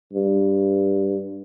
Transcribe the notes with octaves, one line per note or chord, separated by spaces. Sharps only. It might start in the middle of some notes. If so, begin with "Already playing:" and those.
G2